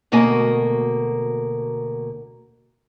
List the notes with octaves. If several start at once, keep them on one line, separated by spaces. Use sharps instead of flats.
D2 B2 A#3 A#4 D#5 G#5